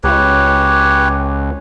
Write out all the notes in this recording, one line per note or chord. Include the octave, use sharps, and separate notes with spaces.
C#2 G4 B4 C#5